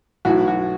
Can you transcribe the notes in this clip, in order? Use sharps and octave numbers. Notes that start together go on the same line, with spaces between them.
B1 A2 E3 F#4
F#4